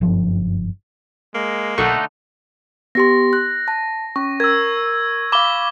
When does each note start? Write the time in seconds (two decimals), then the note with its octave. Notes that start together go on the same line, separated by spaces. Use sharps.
0.01 F#1 G2 F3
1.35 G#3 A#3
1.78 B1 D3 A3 D#4 A4 F#5 C#6
2.95 B3 G4 C6 A#6
3.33 F#6
3.68 A5
4.16 C#4 C#6
4.40 A#4 E6 G#6
5.32 F5 B5 D6 G7